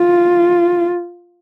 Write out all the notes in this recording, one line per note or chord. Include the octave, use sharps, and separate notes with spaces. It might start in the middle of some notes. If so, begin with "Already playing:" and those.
Already playing: F4